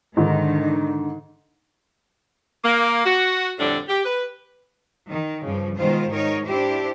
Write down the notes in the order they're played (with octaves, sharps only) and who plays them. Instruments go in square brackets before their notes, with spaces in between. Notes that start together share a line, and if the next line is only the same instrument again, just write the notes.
[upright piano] G#2 D3 [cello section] D#3 [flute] D4
[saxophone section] A#3
F#4
F2 A2 D3 G3 D4
G4
B4
[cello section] D#3
G2 C#3 F3
B2 D#3 G#3 F4 C5
G#2 D#3 D#4 A#4 C#5
D4 E4 G4 C5